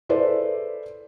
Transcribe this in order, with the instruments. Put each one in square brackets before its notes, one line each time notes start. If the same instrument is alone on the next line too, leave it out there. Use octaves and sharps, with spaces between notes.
[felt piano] E4 G#4 A4 B4 C5 D5